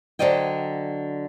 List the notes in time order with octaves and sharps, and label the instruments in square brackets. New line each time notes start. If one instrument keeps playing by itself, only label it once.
[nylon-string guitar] D3 F#3 C5 D5 D#5 G5